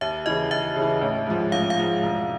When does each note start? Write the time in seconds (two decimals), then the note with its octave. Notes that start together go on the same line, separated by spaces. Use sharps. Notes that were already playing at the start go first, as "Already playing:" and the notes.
0.01 D#2 E5
0.26 C#3 E3 D#5
0.51 D#2 E5
0.76 C#3
0.82 E3
1.01 A1
1.27 G#2 F3
1.52 A1 F5
1.70 F5
1.77 G#2 F3
2.03 E1